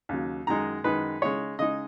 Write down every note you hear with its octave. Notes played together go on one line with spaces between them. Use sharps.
D#2 C#3 F#3
F#2 D#3 G#3 D#4 A#5
F#2 D#3 G#3 D#4 B4
C#3 G#3 D#4 C#5
C#3 G#3 D#4 D#5